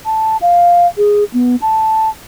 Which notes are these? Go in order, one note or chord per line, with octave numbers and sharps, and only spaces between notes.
A5
F5
G#4
B3
A5